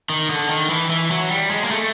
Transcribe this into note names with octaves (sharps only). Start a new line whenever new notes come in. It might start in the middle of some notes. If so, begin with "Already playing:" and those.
D#3
D3
D#3
E3
E3
F#3
G3
G#3
A#3
A3